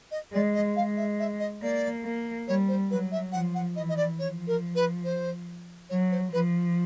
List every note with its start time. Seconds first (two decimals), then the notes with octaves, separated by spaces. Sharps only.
0.11 D#5
0.33 G#3 D5
0.54 D#5
0.76 G#3 F5
0.97 E5
1.20 E5
1.40 D#5
1.62 A#3 D5
2.04 A#3
2.47 G3 C#5
2.68 C5
2.90 F#3 B4
3.12 E5
3.32 F3 F#5
3.55 F#5
3.76 E3 D#5
3.89 D#5
3.97 D5
4.18 F3 C#5
4.47 A#4
4.75 B4
5.04 C5
5.89 F#3 C#5
6.11 C5
6.32 F3 B4